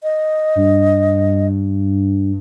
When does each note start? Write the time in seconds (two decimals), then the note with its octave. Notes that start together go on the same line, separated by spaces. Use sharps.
0.03 D#5
0.56 G2